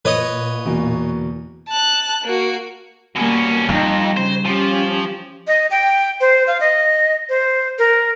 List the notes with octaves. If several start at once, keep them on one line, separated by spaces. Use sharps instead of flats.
A#2 B4 C#5 D#5
E2 B2 A#3
A5 F#6
A#3 F#4
B2 G3 A#3 C#4
F2 G3 D#4
C#3 C5
F3 C#4 G4
D#5
G5
C5
F5
D#5
C5
A#4